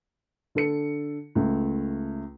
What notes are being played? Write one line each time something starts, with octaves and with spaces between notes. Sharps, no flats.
D3 A4 C#7
C#2 A3